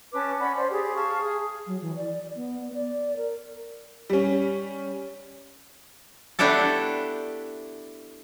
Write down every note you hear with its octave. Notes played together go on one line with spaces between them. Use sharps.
C#4 B4 A5 D6
C#4 D5 F#5 B5
C5 D5
G4 G#4
F5 A5 C#6
G#4
F#3
E3
D5
B3
D5
A#4
G3 C#4
A3 B3 D4 E4 G4 A4